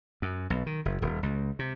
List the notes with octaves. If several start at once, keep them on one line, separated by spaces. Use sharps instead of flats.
F#2
B1
D#3
F#1
D#1
C#2
C3